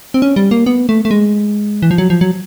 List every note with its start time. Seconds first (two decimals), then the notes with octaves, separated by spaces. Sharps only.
0.14 C4
0.22 C#4
0.36 G3
0.51 A#3
0.66 B3
0.89 A3
1.05 A3
1.11 G#3
1.82 E3
1.91 F3
1.98 F#3
2.10 F3
2.21 F#3